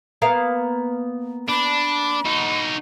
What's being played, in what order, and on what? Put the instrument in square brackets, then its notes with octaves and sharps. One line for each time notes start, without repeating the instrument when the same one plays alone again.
[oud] A#3 B3 F5
[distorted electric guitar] D4 [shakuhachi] B5
[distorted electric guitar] D#4 F#4